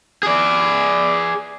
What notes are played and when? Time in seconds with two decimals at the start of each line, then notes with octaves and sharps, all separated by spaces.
0.23 G#4 D5